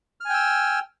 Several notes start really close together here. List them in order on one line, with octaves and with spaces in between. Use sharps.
F6 G#5 G5 E6